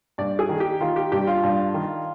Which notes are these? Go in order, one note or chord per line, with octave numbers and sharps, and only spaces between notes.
G2 D5
G#4
D#3
G4
D#3 F4
G4
G2 G4
F4
G2
D#3